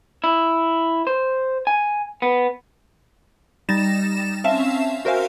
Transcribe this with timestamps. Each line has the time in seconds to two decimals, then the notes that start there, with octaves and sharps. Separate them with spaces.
0.24 E4
1.07 C5
1.67 G#5
2.22 B3
3.69 G3 D#4 A6 A#6 E7
4.44 C4 C#4 E5 F5 A5 E7
5.05 F#4 A#4 C5 E5 F5 G#5